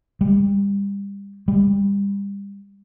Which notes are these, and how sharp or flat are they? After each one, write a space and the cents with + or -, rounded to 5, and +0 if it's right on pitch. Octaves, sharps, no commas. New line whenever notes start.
G3 +30
G3 +30